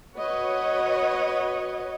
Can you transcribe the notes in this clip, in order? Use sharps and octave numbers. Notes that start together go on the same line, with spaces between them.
F#4 B4 C#5 D#5 F#5